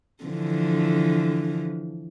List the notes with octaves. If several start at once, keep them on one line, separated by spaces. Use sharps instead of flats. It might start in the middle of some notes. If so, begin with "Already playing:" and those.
D3 E3 F3